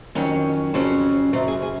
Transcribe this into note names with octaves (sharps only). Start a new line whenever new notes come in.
F2 D#3 F#3 C#4 C#5
F2 C#3 F#3 C#4 C5
F#2 C#3 F#3 C5
G#4
G#4